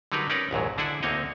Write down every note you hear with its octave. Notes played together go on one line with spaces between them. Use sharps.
D3 F#3 G3 D#4 A#4 B4
C#4 D#4 A#4 B4 D5
A#1 D#2 G#2 F#3
D3 D4 E4 G#4 E5 F#5
D2 A#3 C4 D#4 C#5 D#5